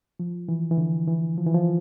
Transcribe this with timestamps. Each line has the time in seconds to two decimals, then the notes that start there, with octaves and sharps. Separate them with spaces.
0.20 F3
0.49 E3
0.71 E3
0.78 D3
1.08 E3
1.37 F3
1.46 E3
1.54 F3